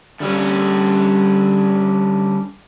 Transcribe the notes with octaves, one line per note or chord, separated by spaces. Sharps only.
D3 G3 C#4